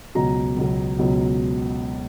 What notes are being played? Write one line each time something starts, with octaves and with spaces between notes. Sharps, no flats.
C#2 B2 F#3 A#5
C#2 B2 F#3
C#2 B2 F#3